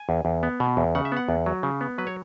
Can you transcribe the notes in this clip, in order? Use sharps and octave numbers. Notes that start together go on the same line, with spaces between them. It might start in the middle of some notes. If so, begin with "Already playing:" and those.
Already playing: G#5
E2
E2
B3
B2
E2
C#3 F#5
E5
B3 F#5
E2
F#3
C#3
B3
F#3 B4
C#5